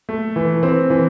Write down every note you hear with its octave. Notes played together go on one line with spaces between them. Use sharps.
A3
E3
C4
E3